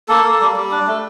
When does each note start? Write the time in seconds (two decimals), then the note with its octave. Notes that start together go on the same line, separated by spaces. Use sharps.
0.08 A#3 A4
0.24 A#3
0.40 G3
0.56 G3
0.71 D4
0.87 A3